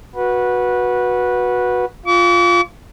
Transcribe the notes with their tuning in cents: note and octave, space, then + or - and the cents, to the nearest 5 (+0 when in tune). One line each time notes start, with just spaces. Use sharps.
F#4 -10 B4 -15
F4 +0 D6 -45